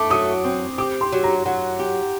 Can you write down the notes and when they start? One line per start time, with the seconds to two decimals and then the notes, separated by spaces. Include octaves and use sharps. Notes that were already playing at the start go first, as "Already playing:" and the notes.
Already playing: A3 D6
0.10 F#3 D#6
0.44 C4
0.78 G4 D6
1.01 C6
1.12 F#3
1.24 A#5
1.46 F#3 F#5
1.79 G4